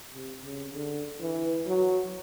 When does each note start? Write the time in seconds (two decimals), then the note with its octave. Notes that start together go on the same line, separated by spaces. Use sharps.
0.14 C3
0.44 C#3
0.74 D3
1.21 E3
1.66 F#3